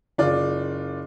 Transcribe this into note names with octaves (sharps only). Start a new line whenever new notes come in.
F#1 F4 D5